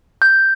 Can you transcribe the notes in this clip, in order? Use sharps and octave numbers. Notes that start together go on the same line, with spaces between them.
G6